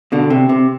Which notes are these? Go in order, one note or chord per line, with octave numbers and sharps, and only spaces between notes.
B2 D3
C3
C3